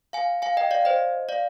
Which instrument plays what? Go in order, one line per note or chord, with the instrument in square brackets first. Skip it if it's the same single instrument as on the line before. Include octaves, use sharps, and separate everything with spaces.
[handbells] F5 G#5
F5 G#5
D#5 G5
D5 F5
C5 D#5
D5 F5